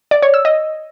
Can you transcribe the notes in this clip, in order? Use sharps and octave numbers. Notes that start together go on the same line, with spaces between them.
D5
C#5
E6
D#5